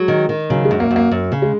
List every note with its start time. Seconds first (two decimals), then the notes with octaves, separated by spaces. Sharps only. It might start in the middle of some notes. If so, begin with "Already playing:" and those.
Already playing: F#3 G#3
0.08 D#3
0.29 D#3
0.50 C#3 F#3
0.65 G#3
0.71 F#2
0.80 A#3
0.91 F#2
0.96 A#3
1.11 F#2
1.32 C#3
1.42 G#3